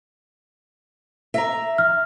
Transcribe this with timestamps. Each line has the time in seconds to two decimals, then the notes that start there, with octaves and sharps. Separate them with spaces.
1.34 E5 A#5
1.78 F6